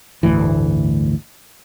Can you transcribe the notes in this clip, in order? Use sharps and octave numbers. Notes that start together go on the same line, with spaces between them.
G1 D2 A2 E3